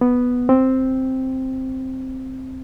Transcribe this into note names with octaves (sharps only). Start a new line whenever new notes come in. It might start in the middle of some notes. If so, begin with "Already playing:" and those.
B3
C4